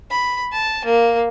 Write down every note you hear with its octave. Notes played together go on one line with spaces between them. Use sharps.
B5
A5
A#3